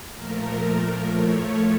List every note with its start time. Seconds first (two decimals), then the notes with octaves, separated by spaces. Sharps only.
0.14 A#2 F3 A3 A#4
1.12 A2 F3 A3 C#5